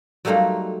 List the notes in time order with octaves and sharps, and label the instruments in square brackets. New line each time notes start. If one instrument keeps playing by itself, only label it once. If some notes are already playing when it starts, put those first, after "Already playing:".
[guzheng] F#3 G3 A3 A#3 D#4 F4